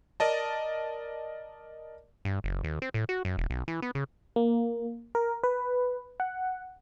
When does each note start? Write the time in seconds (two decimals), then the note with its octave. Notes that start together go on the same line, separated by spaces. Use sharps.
0.20 A#4 D5 D#5 A5
2.25 G2
2.44 F#1
2.64 D#2
2.82 C4
2.94 A2
3.09 F#4
3.25 F#2
3.37 E1
3.50 B1
3.68 E3
3.82 B3
3.95 C#3
4.36 A#3
5.15 A#4
5.44 B4
6.20 F#5